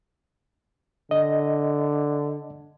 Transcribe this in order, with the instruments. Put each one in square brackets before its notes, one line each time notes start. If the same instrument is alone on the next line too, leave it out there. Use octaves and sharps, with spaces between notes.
[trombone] D3 [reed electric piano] D#5